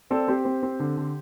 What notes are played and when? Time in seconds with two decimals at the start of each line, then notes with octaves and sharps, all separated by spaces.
0.10 C4 A4 D5
0.28 C4 G4 C5
0.45 C4
0.63 C4
0.80 D3
0.97 D3